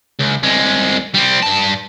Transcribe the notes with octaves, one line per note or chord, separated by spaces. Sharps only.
C#2
C2 G#3
G3 C4
G2 A5